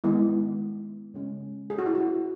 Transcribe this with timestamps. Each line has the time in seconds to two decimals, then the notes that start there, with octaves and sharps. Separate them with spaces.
0.04 D#3 G#3 B3 E4
1.14 C#3 G#3 C#4
1.70 G#4
1.78 F#4
1.86 E4
1.95 F#4